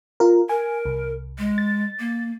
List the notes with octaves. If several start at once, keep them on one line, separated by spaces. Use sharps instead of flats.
F4 A#4
A#4 G#5
C2
G#3
A6
A#3